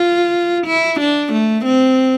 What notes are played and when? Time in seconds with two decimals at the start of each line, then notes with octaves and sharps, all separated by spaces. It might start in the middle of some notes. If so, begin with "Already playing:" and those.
Already playing: F4
0.67 E4
1.00 D4
1.32 A3
1.65 C4